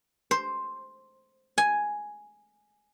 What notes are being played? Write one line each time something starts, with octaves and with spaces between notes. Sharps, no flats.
C5
G#5